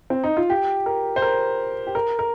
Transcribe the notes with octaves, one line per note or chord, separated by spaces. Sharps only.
C4
D#4
F4
G4
A#4
C5
A#4
G4
A#4
A#4